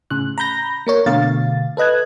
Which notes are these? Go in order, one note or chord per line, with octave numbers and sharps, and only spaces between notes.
A2 C#3 F#6
A#5 B5 G6 A#6
A#3 A#4 C#5
B2 D3 A3 F5 A6
A4 B4 D#5 F#6 G#6